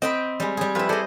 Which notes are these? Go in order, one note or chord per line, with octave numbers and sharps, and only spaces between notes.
C4 D#5 G5 B5
G3 G#3
G3 G#4
F3 E4 G4 B4
G#4 A4 C5 D5 D#5